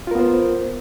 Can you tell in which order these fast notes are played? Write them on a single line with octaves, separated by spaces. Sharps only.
F4 A#4 B3 C5